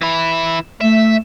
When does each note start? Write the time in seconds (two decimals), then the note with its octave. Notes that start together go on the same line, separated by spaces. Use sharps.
0.02 E3 E4
0.81 A3 E5